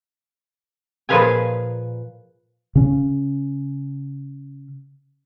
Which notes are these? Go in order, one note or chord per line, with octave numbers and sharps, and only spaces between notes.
A#2 F3 G#4 B4 F5 G#5
C#3 C#4